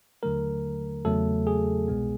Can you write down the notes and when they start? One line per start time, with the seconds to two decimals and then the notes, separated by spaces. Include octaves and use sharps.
0.23 D#2 D3 F#3 A3 A#4
1.05 E2 C#3 F#3 A3 A4
1.47 G#4
1.88 C2 B2 G#3 B3